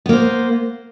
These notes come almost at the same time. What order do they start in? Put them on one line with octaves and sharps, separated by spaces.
B3 A#3 C5